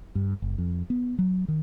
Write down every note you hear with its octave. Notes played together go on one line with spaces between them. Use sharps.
G2
F#1
F2
B3
F#3
D#3